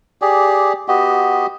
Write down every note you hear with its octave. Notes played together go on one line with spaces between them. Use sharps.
G4 G#4 D5
B3 F#4 G4 D#5